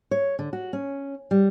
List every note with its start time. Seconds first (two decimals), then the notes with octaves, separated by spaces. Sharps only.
0.11 C#5
0.39 D3
0.53 F#4
0.73 C#4
1.31 G3